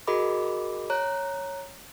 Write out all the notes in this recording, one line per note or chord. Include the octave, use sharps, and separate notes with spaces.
F#4 G#4 A#4 D#5 B5 D6
C#5 A#5 F#6